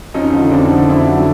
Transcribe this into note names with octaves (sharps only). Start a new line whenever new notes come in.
F2 C#4 D#4
D3 F3
F2 C4 D4
D3 F3
F2 D4 E4
D3 F#3